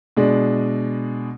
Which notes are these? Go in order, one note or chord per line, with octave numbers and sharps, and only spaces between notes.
B2 G#3 D4